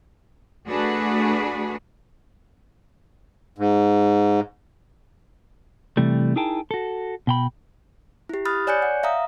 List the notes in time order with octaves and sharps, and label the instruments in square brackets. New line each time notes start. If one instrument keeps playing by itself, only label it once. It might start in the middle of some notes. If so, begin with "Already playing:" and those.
[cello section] A3 D4 F#4 G#4 B4
[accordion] G#2
[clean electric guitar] C3 E3 G3 A3
D#4 E4 G#4 A#4 G5 A5
F#4 A4
B2 G5 B5
[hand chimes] E4 G4
B5 D#6 F6 F#6 A6
C#5 D5 G#5 F#6 G6 C#7
F#5
E5 F5 A#5 D#6